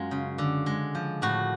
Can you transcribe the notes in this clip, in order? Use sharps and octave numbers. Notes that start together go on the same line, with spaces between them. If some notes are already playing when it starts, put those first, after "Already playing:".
Already playing: F#2 G#3 F4
C#3
D3
G#3
F3
A2 F#4